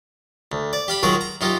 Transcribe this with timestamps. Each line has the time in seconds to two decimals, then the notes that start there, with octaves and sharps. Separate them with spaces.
0.52 D2
0.73 D5
0.88 G4 F5 B5
1.03 D#3 F#3 F4 F#4 G#4 A#4
1.21 A#5
1.41 F#2 D#4 F4 G4